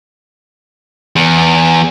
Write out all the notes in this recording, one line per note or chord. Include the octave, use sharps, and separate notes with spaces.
E2